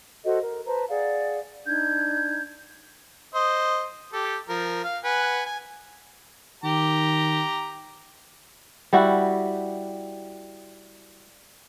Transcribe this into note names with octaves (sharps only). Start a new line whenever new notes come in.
F#4 A4 C5 D#5
A#4
B4 C5 A5 A#5
G#4 D5 F5 F#5
D4 D#4 G6 G#6
C5 D#5
G4 A4
F3 A#4
F5
B4 F#5 G#5
G#5
D#3 G4 A#5
G3 E4 F#4